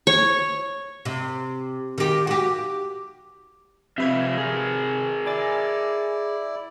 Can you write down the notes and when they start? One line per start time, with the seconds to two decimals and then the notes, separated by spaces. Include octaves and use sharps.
0.07 C#5
1.05 C3
1.98 D#3 G4
2.27 F#4 G4
3.98 C3 F3 B4 E5 F5 G#6
4.38 G#4 A#4
5.26 E4 D5 G#5 D6 A6